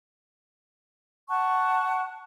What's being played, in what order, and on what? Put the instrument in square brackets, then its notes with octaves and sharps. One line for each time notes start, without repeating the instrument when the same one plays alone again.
[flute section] F#5 A5 C#6 F#6